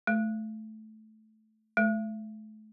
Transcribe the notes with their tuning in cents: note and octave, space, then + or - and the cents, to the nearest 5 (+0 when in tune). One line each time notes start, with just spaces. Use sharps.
A3 -15
A3 -35